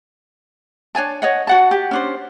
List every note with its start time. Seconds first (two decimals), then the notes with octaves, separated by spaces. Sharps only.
0.95 D4 C#5 G#5 A5
1.22 C#5 D#5 F#5
1.47 F#4 F#5 A5
1.71 G4
1.91 C#4 D4 C5